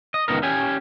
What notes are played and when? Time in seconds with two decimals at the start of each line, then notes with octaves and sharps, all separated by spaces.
0.14 D#5
0.28 C#2 B3 D#4 A#4
0.43 C#4 G4 G#5